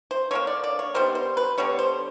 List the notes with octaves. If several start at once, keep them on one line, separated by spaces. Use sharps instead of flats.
C5
D3 G3 A#3 C#5
D5
D5
C#5
D#3 G3 B3 C5
C5
B4
D3 G3 B3 C#5
C5